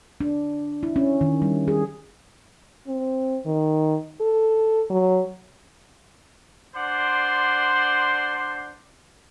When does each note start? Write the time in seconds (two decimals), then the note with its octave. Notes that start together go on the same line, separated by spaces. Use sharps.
0.21 D4
0.83 E4
0.96 C#4
1.21 D#3
1.42 G3
1.68 G#4
2.87 C4
3.46 D#3
4.21 A4
4.90 F#3
6.75 D4 C5 D5 F#5 C6 D6